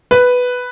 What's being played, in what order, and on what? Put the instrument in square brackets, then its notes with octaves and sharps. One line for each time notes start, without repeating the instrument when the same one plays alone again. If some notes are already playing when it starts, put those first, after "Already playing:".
[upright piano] B4